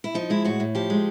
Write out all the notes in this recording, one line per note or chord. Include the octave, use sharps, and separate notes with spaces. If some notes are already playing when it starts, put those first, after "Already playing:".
E4
F3 D#4
G#3 E4
A2 F#4
A2
F3 G4
G#3